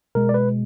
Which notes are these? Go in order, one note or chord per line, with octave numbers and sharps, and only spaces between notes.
B2 G#3 A#4
D5
B4